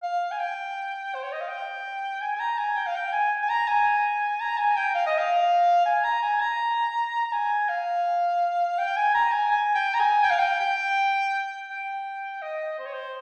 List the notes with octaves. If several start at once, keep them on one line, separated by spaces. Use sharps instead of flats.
F5
G#5
G5
C5
C#5
D#5
F5
G5
G#5
G#5
A#5
G#5
G5
F5
G5
G#5
G#5
A#5
G#5
A#5
G#5
G5
F5
D#5
F5
G#5
A#5
G#5
A#5
A#5
G#5
F5
G5
G#5
A#5
G#5
G#5
G5
A#5
G#5
G5
F5
G5
G5
G5
D#5
C5
C#5
C5